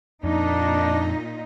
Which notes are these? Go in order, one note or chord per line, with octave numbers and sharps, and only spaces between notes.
F2 A#2 D4 D#4